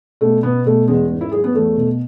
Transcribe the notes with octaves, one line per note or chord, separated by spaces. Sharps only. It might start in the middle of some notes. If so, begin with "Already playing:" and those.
B2 A3
B2 B3
B2 A3
E2 G#3
G#2
E4
F#3 G#4
B3
E2 A3
B2